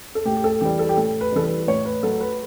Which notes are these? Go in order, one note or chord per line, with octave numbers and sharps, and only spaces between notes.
A4
A2 G4
G4
A4
E3 G3 G4
A4
G4
A2 A4
B4
E3 G3 A4
B4
A2 C#5
B4
F#3 A3 A4
B4